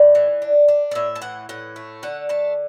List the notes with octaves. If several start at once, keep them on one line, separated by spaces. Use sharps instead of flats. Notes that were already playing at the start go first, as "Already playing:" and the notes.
Already playing: A2 D5
E3
D4
D4
D5
A2 E5
A5
E3 F#5
A2 F#5
A3
D3 F#5
A3 A5